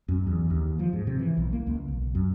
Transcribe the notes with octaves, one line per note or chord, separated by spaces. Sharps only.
F#2
E2
D#2
F3
G#2
C3
E3
B1
A#3
C#2
B1
F#2